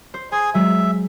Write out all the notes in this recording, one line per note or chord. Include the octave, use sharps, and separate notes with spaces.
C5
G#4 C5 G#5
F#3 G#3 G#4 E5